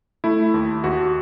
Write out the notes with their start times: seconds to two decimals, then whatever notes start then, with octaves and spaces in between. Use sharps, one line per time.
0.24 A3 E4
0.54 D#2
0.84 D#2 F#4